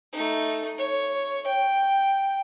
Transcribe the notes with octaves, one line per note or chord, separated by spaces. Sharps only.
A3 D#4
C#5
G5